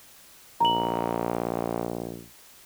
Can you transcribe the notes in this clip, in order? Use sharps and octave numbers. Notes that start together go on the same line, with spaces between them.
A#1 A#5 F#7